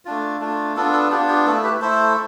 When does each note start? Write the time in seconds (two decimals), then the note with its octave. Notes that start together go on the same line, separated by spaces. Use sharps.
0.05 A3 D4 F4
0.40 A3 D4 F4
0.76 B3 D4 F4 A4
0.93 A4
1.11 B3 D4 F4 G4
1.29 G4
1.47 A3 E4 A4
1.64 G4 B4
1.81 A3 E4 A4 C5